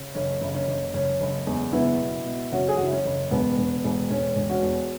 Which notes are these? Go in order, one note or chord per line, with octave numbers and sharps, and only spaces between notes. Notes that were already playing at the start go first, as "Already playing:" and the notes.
Already playing: C#3
F#1 C#4
F#1
C#4
F#1
F#1 C#4
F#1
E2
F#1 B3 E4
B2
B2
F#1 C#4 F#4
G#4
F#1 F#4
E4
C#4
F#1
E1 B3
E1
E1
E1 C#4
E1
C#4 F#4
E2